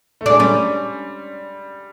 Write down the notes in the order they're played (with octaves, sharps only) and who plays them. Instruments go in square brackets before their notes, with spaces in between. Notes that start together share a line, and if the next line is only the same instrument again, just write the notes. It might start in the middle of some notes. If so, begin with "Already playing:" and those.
[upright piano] A3
[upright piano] G#3 [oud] D4
[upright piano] G3 [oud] C#4